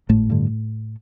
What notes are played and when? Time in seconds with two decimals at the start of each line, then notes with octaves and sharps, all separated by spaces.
0.09 G#1 A2 A3
0.30 G2 D3